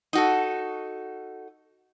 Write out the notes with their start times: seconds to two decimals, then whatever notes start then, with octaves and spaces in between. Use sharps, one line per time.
0.13 D#4 F#4 A4